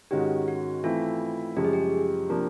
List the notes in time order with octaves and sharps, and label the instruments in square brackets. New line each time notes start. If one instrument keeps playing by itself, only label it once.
[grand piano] G#2 D#3 G#3 C#4 F#4 [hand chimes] G4
[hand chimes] F#4
[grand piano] E3 A3 C4 E4 [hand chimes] F4
[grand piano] F#2 C#3 F3 G#3 [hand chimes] G4
[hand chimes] G#4
G4
[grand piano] C3 F3 A#3 D4